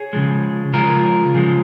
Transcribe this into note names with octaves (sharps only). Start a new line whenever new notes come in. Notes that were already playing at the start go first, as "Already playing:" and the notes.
Already playing: G#4 C#5
C#3 F3 G#3
C#3 F3 G#3 F4 A#4
C#3 F3 G#3